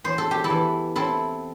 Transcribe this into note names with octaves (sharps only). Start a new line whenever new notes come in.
E2 C5
A4
G4
E4 A4
E3
C4 E4 A4